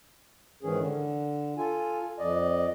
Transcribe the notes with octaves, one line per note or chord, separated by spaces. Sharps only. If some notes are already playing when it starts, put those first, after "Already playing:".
G#2 D#3 E3 C#4 G#4
D3
F4 A4 G#5
F2 D5 D#5